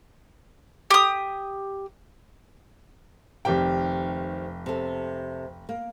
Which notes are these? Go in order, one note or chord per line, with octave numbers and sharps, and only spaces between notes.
G4 D#6
F1 C3 D#3 G4 G5
C3 A4
A#3